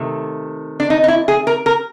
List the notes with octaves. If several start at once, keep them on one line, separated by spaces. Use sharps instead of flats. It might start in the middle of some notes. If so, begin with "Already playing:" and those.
Already playing: C3 D#3 A3
D4
D#4
D#4
E4
G#4
A#4
A#4